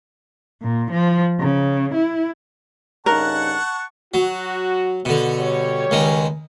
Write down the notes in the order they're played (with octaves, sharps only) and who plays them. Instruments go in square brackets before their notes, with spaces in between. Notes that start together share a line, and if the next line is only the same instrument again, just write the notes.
[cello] A#2
F3
C#3
E4
[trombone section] G2 C#3 D#4 [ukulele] A#4 [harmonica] F#5 A5 C#6 [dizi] F#6
[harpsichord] F#3 [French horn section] F#4
[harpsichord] B2 D3
[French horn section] G3 G4 C#5
[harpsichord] C#2 D#3 G#3